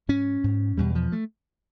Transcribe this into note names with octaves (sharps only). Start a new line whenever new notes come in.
G#2 C#4
G#2
E2 B2 G3
F3
A3